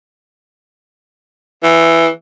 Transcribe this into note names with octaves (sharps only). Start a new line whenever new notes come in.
E3